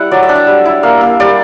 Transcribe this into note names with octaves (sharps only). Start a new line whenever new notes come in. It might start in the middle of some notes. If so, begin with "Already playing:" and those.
Already playing: G3 E4 F#5
F#3 D5
E5
D4
E5
G3
E4
A#3
A#3
G3 D5